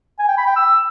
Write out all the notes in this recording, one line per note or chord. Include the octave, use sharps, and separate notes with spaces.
G#5
G5
B5
G5
E6